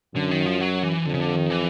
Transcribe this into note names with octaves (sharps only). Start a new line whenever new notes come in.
F#2 D3
D#3
F3
F#3
E3
F2 D3
C#3
D3
D#3
E3